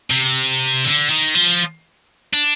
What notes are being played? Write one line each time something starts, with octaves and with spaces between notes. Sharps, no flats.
C3
D3
D#3
F3
D4